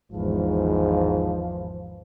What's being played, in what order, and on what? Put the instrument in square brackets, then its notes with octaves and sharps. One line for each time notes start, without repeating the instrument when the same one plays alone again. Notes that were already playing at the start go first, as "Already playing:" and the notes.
[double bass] G#1 E2 [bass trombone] G#2 [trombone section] F3